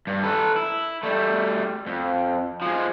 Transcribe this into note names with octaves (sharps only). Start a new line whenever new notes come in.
G2
A4 B4
E4
G3 A3
F2
F3 G#3